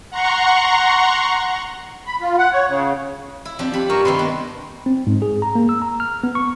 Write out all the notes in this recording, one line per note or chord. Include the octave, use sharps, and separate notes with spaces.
F#5 A#5 C6 C#6
B5
F4
F#5
C#5
C#3
E4
F3 C4 D4 G4
F2 G4 B5
G2 A#4 C#6
C3 D#3 A#3 B4 C6
B3 D4
C4
G#2
G#4
A#5
A#3
E6
A#5
F6
B3
C#6